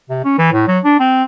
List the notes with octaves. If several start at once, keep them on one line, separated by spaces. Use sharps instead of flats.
C3
C#4
E3
A2
F#3
D4
C4